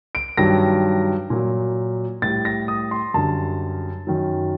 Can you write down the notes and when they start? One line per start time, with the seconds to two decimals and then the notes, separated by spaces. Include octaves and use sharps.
0.15 D7
0.37 G2 D#3 F#3 A#6
1.30 A#2 F#3
2.22 A2 G3 A6
2.45 A#6
2.68 D#6
2.91 C6
3.14 F#2 D3 G3 A5
4.07 F#2 D#3 F#3